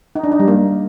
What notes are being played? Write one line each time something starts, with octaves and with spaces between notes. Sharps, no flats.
D#4
D4
D#4
G3
A#3